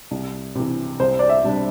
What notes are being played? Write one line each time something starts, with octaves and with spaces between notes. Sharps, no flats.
C2
C3 E3
C2 C5
D5
E5
C3 G3 D4